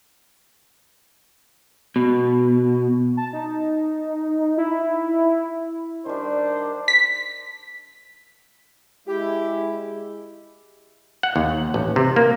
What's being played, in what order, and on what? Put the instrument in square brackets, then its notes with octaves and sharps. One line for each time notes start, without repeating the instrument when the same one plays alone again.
[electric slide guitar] B2
[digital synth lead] A5
D#4
E4
[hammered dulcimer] D#3 G3 [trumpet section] D4 C5
[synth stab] B6
[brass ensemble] G#3 E4 [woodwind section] G4
[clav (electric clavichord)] F#5
D#2
A1
C3
A#3